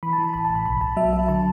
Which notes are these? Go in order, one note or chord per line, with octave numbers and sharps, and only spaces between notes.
E3 B5
A5
E3
A5
A1 B5
A5
A2
B5
B1 B5
B1 A5
F#3 E5
F#3 E5
D3 A5